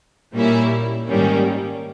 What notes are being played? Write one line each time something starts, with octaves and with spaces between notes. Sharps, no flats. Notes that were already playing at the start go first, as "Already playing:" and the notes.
A#2 G3 A#3 C#4 E4
G#2 D#3 G3 A#3 C#4